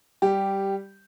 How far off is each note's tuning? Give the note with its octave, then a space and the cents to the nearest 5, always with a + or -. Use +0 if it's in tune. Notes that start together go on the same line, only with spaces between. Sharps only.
G3 +0 G4 -5